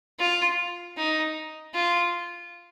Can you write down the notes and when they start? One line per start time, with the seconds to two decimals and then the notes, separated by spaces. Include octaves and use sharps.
0.19 F4
0.97 D#4
1.75 F4